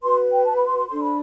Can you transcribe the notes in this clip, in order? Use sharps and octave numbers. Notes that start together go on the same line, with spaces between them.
F#4 B4 C6
G5
A5
B5
C6
C6
D4 A4 C5 C6
B5